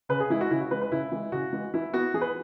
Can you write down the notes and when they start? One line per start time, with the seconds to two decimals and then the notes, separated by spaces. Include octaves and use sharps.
0.09 C#3 B4
0.20 G#4
0.30 E3 G#3 E4
0.41 F#4
0.51 C#3 E4
0.60 F#4
0.71 E3 G#3 B4
0.81 B4
0.91 C#3 E4
1.12 E3 G#3
1.32 C#3 F#4
1.53 E3 G#3
1.74 E3 E4
1.93 B3 F#4
2.14 E3 G#4
2.21 B4